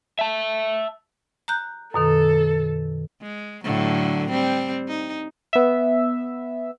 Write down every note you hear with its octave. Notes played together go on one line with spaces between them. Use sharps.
E5 A5
A#5 F#6 G6
F#2 B2 D#3 A4
G#3
A2 D3 F#3
G3 C4
D#4
B3 E5